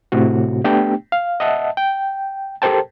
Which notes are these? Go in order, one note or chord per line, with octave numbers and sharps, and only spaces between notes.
A2 C3 F#4
A3 B3 D4 G4 G5
F5
D#5 E5 F#5 A5
G5
G4 A4 A#4 C5 G5 A5